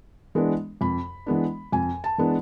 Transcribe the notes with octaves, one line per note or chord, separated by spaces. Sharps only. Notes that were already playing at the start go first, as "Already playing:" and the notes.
E3 G#3 B3 D4
F2 B5
E3 G#3 B3 D4
F2 G#5
A5
E3 G#3 B3 D4